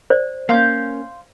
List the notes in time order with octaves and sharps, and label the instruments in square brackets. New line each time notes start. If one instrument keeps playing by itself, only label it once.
[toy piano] C5 D5
[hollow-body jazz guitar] A#3 C#4 [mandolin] F5 C6 G6